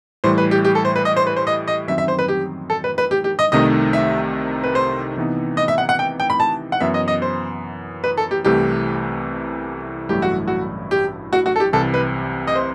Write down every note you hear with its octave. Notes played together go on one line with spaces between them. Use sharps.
A2 E3 G3 C5
B4
G4
G4
A4
C5
B4
D#5
C5
B4
C5
D#5
D#5
F#2 D#3 F#3 C4 E5
E5
C5
B4
G4
A4
B4
B4
G4
G4
D#5
C2 C3 D#3 A3 D#4 D#5
E5
B4
C5
C3 E3 B3 D#4
D#5
E5
F#5
F#5
G5
G5
B5
A5
F#5
F#2 E3 B3 E5
D#5
D#5
C5
B4
A4
G4
C2 C3 E3 A3 G4
A1 G2 F#3 A3 E4 G4
F#4
F#4
G4
F#4
F#4
A4
G4
C2 C3 E3 A4
B4
D#5
C5